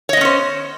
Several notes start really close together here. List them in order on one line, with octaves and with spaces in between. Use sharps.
C#5 D#5 B3 C#4 C5